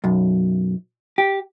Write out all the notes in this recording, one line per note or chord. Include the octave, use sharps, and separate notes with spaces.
B1 F#2
G4